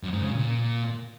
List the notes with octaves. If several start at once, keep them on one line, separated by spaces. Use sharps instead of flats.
F#2
G#2
C#3
A#2